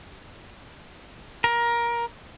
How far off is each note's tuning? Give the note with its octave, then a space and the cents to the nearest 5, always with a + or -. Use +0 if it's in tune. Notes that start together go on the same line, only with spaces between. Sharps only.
A#4 +20